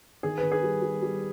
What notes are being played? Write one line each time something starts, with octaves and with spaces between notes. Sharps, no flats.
D#3 G#4
B4
D#3
G#4
G3
G3
G3